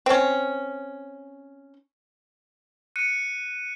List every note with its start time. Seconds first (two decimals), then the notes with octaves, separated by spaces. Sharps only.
0.06 C4 C#4
2.96 F#6 C#7 D#7